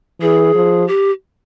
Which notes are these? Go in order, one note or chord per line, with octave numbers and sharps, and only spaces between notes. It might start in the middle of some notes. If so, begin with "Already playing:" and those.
E3 G#4
F3
G4